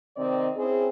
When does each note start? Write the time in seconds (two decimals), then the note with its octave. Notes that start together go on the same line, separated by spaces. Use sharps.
0.17 C3 D#3 C4 D5 D#5
0.56 C4 C#4 E4 G#4